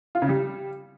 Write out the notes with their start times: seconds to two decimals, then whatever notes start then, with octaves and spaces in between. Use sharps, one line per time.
0.15 F4
0.22 C#3
0.29 G3